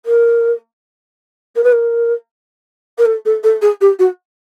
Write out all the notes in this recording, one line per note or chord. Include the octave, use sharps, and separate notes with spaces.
A#4
A#4
B4
A#4
A#4
A4
A4
A4
G#4
G4
F#4